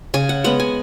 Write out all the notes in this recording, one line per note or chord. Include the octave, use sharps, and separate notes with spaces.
C#3 G#5
F#5
G#3 B3 F#5
G#5